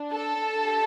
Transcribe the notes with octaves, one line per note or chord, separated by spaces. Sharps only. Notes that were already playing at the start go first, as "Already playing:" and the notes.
Already playing: D4
A4 A5
D4 G4